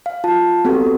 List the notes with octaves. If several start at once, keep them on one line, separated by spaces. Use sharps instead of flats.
F5
F4 A5
B3 C4 F#4 G4 A4